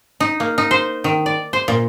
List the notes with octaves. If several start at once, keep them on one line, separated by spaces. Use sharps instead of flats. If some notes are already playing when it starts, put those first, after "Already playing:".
D#4
A#3
D#4
C5
D#3
D5
C5
A#2